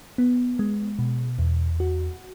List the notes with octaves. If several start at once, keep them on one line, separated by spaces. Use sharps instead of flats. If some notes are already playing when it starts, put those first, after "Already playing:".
B3
G#3
B2
E2
F#4